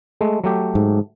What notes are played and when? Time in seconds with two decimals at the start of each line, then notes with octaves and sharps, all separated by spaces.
0.21 G#3 A3
0.44 F#3 A3 G4
0.75 G#2